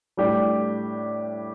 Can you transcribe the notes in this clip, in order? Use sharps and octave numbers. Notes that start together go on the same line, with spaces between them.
A2 G3 D4 G4